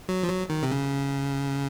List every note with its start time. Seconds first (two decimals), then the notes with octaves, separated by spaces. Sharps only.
0.09 F#3
0.23 F3
0.29 F#3
0.50 D#3
0.63 C3
0.71 C#3